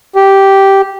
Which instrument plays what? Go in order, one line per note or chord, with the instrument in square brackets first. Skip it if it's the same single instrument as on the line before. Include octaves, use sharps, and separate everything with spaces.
[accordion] G4